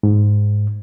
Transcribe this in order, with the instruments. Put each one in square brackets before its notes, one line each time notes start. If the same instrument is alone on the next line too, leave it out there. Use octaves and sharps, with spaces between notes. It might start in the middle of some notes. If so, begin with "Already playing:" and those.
[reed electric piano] G#2